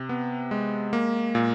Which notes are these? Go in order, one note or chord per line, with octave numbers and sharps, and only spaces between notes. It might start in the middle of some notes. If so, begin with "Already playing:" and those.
Already playing: C3
B3
G#3
A#3
A#2